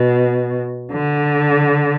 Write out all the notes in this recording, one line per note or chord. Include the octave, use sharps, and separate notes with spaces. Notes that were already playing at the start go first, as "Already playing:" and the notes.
Already playing: B2
D3